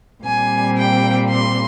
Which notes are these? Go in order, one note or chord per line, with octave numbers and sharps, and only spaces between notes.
A#2 G3 C4 G#5
G5
C6